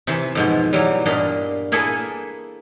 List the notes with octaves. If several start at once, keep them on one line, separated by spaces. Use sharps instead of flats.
C3 E3 E5
F2 G#2 B2
E3 F#3 G3
G2 A#2 D4 D#5 F5 B5
A#3 E4 G#4 A4 B4 G#5